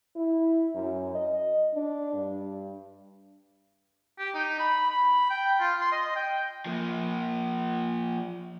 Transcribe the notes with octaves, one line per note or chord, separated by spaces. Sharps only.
E4
F#2
D#5
D4
G2
G4
D#4
B5
B5
G5
F4
C6
D#5
G5
F3 A#3